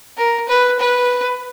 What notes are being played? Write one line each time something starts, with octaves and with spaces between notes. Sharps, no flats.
A#4
B4
B4